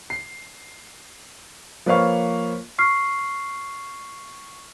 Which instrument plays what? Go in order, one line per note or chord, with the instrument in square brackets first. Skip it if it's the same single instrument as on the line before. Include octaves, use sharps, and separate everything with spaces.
[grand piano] C7
F3 A#3 B4 C#5 F5 C#6
[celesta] C#6 F6 C7